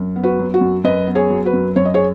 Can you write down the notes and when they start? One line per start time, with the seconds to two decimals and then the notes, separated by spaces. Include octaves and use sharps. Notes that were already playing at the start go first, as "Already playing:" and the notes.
Already playing: F#2
0.16 B3
0.23 F#4 B4
0.39 F#3
0.54 F#4
0.61 F#2
0.84 F#2 B4 D#5
1.07 B3
1.15 G#4 C#5
1.30 F#3
1.45 F#4 B4
1.53 F#2
1.76 F#2 C#5
1.86 D#5
1.94 G#4 C#5